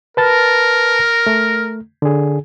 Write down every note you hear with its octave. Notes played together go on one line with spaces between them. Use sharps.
A#4 B4 A5 A6
A3
D3 G#4